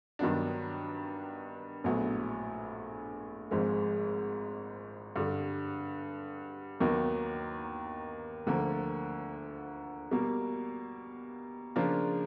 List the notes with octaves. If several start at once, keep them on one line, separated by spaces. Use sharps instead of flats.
G2 D#3 F#3 B3 D4
A#1 A2 F#3 B3
G#1 G#2 F3 G#3
G2 D3 G3
D#2 D#3 F#3 B3
D2 D3 F3 A#3
B2 G3 A#3
C#3 F3 A#3 D4 F4